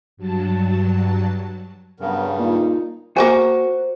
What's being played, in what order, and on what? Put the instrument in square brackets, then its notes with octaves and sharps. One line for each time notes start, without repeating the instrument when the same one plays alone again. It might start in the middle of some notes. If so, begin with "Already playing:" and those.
[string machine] G2 F#3 A5
[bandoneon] G2 C#3 [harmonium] F#3 B3 A#4
[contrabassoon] A#2 [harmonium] D#4
[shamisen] A#3 G5 G#5 [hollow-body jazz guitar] F#4 A#4 [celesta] C5